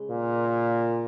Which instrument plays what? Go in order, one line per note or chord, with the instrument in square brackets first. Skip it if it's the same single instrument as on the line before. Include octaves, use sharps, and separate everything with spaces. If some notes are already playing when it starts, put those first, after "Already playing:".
Already playing: [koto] C#3 G#3
[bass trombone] A#2